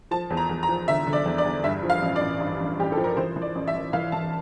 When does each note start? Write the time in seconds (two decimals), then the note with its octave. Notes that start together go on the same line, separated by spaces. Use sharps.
0.11 F3 A5
0.30 E2
0.37 A#5
0.49 E2
0.63 A#5
0.69 F3
0.88 D3 E5
1.07 D3
1.13 D5
1.26 E2
1.38 D5
1.45 E2
1.64 G2 E5
1.83 F3
1.90 F5
2.02 A1
2.16 D5
2.21 A1
2.41 G2
2.60 A1
2.79 A1 G4
2.92 A4
2.97 F3
3.04 A#4
3.17 E3 C5
3.36 E3
3.42 D5
3.55 A1
3.68 E5
3.74 A1
3.93 E3 F5
4.12 E3 A5